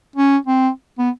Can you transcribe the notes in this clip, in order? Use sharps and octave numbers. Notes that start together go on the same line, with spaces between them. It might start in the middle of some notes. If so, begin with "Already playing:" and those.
C#4
C4
B3